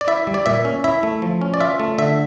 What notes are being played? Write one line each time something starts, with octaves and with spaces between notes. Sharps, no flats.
D5
E4 E5
G3
D5
A#2 E5
C#4
E4 E5
A3
F3
C#4
D5
F4 E5
A3
D3 E5